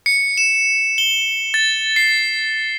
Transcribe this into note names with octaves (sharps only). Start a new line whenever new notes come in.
C#7
E7
G7
A6
C7